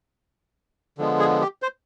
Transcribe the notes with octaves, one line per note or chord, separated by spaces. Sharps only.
D3 F3 G#3 B3
G#4
G4
C5